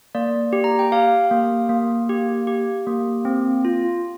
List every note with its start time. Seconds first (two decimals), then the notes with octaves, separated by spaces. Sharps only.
0.15 A#3 D5
0.53 G4
0.64 A#5
0.79 G5
0.92 G4 F5
1.31 A#3
1.69 A#3
2.09 G4
2.47 G4
2.87 A#3
3.25 C4
3.65 F4